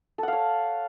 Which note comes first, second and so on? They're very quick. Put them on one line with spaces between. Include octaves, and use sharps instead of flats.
A4 F#5 F5 C#5